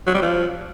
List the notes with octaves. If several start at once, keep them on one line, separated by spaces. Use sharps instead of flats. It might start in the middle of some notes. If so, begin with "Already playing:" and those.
F#3
G3
F3